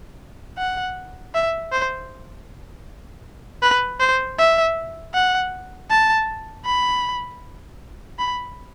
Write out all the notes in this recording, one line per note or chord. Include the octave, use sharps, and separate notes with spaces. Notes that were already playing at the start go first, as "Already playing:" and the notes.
F#5
E5
C5
B4
C5
E5
F#5
A5
B5
B5